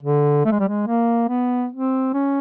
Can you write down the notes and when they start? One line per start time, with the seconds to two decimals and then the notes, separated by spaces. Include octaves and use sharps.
0.03 D3
0.45 A3
0.52 G#3
0.60 G3
0.68 G#3
0.87 A#3
1.29 B3
1.72 C4
2.13 C#4